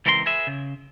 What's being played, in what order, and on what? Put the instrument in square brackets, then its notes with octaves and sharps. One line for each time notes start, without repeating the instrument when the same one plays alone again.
[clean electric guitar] C#2 E3 C4 A#4 E5 C6
G#4 B4 E5
C#3